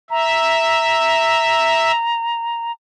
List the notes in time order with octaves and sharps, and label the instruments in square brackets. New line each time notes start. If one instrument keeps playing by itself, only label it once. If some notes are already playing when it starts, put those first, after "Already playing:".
[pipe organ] E5 [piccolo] A#5